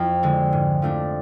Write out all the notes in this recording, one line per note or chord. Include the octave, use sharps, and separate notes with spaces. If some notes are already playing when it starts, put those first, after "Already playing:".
Already playing: F2
D3 G#3
G#2
F3 A3 D4